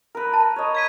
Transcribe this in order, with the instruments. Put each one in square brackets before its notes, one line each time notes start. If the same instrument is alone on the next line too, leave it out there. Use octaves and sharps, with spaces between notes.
[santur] A#4 B4
[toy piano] A5
[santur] C#5 D#5
[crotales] G#6 B6 D#7